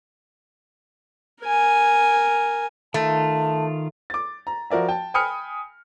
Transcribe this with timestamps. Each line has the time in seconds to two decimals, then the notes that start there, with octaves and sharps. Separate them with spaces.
1.42 A#4 G#5
2.94 D#3 A3 F4 A5
4.10 D6 A6
4.47 A#5
4.70 F3 F#4 A#4 D5 E5
4.88 G5 A5
5.14 G5 G#5 B5 D#6 F6 C#7